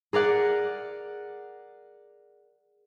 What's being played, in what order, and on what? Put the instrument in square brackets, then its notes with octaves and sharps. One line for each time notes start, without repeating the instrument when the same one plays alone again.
[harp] G#4 A#4 D5 F#5